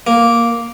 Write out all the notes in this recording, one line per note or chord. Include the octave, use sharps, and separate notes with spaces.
A#3